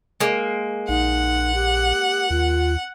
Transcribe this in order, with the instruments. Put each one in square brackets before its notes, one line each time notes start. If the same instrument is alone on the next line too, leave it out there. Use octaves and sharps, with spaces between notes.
[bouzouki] G#3 A#3
[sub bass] A#1 [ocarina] D#4 [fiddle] F#5
[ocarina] G4
[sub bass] D#2 [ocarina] F4